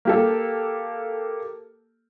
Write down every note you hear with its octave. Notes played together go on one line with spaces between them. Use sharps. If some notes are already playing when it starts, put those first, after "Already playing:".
A#3 G4 A4